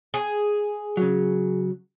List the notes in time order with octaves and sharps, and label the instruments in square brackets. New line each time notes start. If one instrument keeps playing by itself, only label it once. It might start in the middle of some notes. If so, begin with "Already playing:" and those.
[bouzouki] G#4
[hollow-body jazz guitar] C#3 F#3